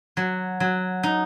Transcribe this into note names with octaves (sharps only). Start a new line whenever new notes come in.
F#3
F#3
D#4